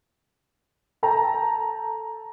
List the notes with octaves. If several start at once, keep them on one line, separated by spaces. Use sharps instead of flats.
A4 G5 A5 A#5